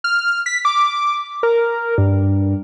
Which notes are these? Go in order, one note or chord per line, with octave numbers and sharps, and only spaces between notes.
F6
B6
D6
A#4
G2